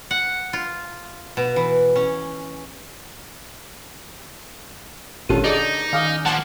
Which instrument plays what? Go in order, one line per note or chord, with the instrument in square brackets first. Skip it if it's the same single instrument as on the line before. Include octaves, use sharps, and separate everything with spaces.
[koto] F#5
F4
B2
E3
C#4
[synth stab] G#1 A#2 F4 [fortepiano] D3 C#4 A4 [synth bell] G4 D#7
[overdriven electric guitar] D#4 [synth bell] G#4 A#4 D#5 [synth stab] D5
[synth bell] D#3 G#5 F6 [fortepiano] F5 D6 D#6
[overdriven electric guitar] F3 A#3 [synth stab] F#5 A5